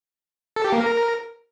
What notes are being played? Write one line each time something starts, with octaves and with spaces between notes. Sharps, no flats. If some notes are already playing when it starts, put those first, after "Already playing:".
A4
G4
A#3
A#4